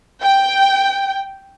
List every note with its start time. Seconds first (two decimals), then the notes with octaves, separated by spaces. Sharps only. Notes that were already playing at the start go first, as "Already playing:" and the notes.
0.23 G5